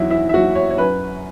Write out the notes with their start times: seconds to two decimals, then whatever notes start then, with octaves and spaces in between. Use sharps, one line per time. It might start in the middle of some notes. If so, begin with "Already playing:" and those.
Already playing: E2 F#3 E4 E5
0.10 E4 E5
0.29 E5
0.34 F#3 F#4 F#5
0.55 C#5
0.71 C#5
0.78 F#2 B4